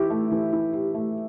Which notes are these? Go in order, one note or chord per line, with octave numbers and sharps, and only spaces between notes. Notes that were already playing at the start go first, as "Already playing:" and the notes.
Already playing: E3 E4 G4
A3
E3
E4
G4
A3